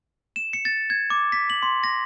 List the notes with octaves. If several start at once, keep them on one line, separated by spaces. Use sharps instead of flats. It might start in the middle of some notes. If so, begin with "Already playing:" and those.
E7
C#7
A6
G#6
D6
B6
F#7
C6
A#6